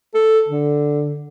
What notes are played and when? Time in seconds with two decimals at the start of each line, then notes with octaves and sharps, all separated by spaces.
0.15 A4
0.48 D3